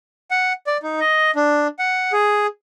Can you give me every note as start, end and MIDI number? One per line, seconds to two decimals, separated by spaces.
0.31 0.53 78
0.67 0.77 74
0.83 1.00 63
1.00 1.31 75
1.35 1.67 62
1.79 2.12 78
2.12 2.47 68